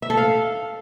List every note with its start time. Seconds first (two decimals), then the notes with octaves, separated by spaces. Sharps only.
0.02 E5
0.10 A4
0.17 F5